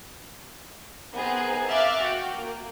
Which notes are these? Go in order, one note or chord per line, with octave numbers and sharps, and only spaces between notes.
B3 C4 D#4 G#4 A#4
E5 F5 D6 F6 F#6 A6
F#4 G5
A#3